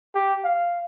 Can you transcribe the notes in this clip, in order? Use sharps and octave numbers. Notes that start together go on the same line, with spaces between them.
G4
F5